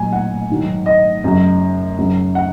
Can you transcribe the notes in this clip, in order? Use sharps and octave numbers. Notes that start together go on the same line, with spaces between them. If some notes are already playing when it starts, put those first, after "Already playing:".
Already playing: A#2 F#3 G#5
F#5
G#2 D#3 F#3
D#5
F#2 C#3 F#3
F#2 C#3 F#3
F#5